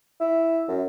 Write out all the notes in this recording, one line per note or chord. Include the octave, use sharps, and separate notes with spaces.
E4
F#2